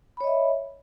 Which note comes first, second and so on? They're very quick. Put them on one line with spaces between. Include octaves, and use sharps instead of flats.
B5 C#5 D#5 E5